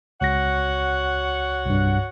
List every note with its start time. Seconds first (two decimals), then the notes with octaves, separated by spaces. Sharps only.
0.21 C#2 F#4 C#5 F#5 A#6
1.66 C2 G2